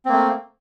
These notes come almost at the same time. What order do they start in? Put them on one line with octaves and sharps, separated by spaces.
C4 A#3 A3